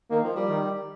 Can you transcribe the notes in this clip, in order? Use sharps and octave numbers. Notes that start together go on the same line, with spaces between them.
D#3 A#3
F3
G3
D#3